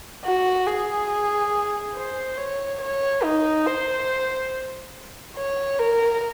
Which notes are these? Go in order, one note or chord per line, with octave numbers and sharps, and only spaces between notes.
F#4
G#4
C5
C#5
C#5
D#4
C5
C#5
A#4